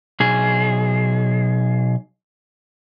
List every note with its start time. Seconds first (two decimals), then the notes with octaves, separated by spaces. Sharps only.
0.20 B1 G#4